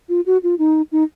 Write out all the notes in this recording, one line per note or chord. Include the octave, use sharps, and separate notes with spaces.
F4
F#4
F4
D#4
D#4